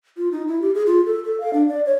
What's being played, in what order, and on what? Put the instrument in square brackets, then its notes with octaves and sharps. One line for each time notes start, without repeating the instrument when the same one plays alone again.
[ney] F4
D#4
E4
G4
G#4
F4
A4
A4
F5
D4
D5
C#5